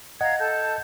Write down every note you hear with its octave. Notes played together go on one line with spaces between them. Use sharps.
D#5 F5 F#5 A#5 G#6
A4 A5 G6